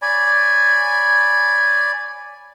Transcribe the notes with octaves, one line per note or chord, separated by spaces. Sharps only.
C#5 D5 G#5 B5